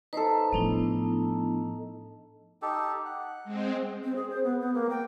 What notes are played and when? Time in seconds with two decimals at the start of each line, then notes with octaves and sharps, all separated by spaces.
0.13 D#4 A4 B4 C5 C6
0.53 A2 F3 B3 D4 E4
2.62 D#4 G4 A4
3.05 F#5
3.44 G#3 C4
4.04 C4
4.16 G#4
4.30 C5
4.44 B3
4.60 B3
4.74 A#3
4.90 G5